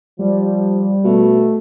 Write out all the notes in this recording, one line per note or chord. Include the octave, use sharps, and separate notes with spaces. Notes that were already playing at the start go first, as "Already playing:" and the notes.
F3 G3
B2 A3